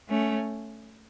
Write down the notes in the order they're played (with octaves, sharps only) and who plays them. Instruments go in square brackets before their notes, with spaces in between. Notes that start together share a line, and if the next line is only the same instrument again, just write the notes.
[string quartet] A3 C#4